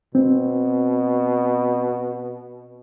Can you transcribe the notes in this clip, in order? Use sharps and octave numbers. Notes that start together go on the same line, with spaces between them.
B2 C4